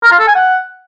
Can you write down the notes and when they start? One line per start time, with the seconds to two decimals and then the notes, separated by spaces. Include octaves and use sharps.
0.03 A#4
0.11 F4
0.19 A4
0.27 G#5
0.35 F#5